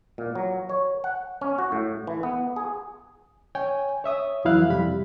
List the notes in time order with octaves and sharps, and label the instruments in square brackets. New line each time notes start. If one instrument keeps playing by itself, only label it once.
[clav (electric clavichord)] A#2
F#3
C#5
F#5
C#4
F#4
A2
E3
B3
G#4
[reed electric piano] C#5 G5 G#5
C#5 E5 D#6
F2 E3 F#3 E4 F5 F#6
F2 C3 G3 B5